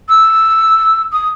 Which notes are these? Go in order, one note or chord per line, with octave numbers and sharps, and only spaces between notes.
E6
D#6